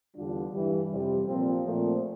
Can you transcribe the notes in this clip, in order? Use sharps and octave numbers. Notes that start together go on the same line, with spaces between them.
E2 D3 G3 D4 F4
G2 E3 G3
F2 C3 G3
A#2 F3 C4 F4
A#2 F3 A3 C4 F4